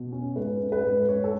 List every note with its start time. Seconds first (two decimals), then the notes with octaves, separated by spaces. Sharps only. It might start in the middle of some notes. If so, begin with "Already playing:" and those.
Already playing: B2
0.12 C#4
0.36 G#2 B4
0.60 C#4
0.72 B4
0.84 G#2
1.08 G#2 C#5
1.24 A4